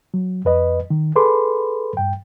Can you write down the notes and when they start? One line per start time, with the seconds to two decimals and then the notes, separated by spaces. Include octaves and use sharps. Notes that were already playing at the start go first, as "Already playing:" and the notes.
0.14 F#3
0.45 F2 B4 D#5
0.90 D#3
1.16 G#4 A4 B4 B5 C6 D6
1.97 G2 G5